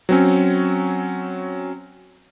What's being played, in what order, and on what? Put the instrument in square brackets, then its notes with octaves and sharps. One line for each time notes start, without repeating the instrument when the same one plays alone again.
[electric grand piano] F#3 C4 C#4